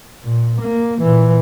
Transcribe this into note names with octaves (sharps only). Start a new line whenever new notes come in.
A#2
A#3
A#2 E3